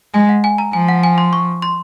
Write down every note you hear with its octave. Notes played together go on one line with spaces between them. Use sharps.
G#3 G#5
F#5
G#5
A#5
F3 G#5
F#5
G#5
C6
C#6
C6